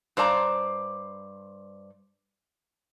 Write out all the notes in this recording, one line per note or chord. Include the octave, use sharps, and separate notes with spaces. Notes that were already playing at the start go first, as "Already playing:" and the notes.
G2 C5 D5 A5 A#5